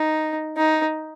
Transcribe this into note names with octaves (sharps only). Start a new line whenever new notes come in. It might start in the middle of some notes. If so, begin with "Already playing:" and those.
Already playing: D#4
D#4